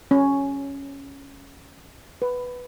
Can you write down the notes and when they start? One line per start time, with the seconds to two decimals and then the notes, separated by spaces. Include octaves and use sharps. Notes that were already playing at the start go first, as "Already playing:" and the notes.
0.11 C#4
2.22 B4